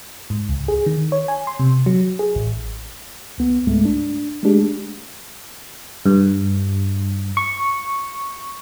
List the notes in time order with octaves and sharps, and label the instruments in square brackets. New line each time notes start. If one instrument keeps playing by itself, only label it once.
[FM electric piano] G#2
C#2
G#4
D#3
C#5
G#5
C6
C3
F#3
G#4
A1
[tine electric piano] C#2 B3
C#2 G#2 G#3 A3
D4
G#3 A3 D4 G4 G#4
[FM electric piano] G2
C#6